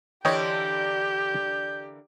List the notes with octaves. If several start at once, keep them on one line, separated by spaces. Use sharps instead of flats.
D3 E3 A#3 G4 C#5 D#5 G5 G6